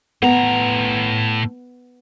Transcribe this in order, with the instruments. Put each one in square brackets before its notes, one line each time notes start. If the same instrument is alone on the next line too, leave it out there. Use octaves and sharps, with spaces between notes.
[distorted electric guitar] A2 A#5 [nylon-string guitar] B3